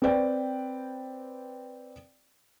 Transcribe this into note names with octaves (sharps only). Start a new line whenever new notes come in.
C4 B4 D5 G5